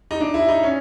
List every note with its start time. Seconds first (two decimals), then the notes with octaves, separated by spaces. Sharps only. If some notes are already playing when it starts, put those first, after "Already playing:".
0.11 D#4
0.20 D4
0.34 E4
0.49 D#4
0.63 C#4